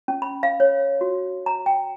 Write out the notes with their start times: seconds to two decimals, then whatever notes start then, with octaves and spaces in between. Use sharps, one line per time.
0.08 C#4
0.22 B5
0.43 F5
0.60 C#5
1.01 F#4
1.46 A#5
1.66 G5